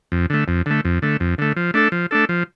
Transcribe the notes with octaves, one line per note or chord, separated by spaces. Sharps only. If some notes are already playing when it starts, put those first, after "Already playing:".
F2
D3 A3
F2
D3 A3
F2
D3 A3
F2
D3 A3
F3
A3 D4 A4
F3
A3 D4 A4
F3